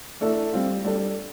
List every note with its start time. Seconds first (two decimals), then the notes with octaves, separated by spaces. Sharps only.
0.21 E3 A3 D4 A4 E5
0.53 G3 C4 F4
0.85 G3 D4 A4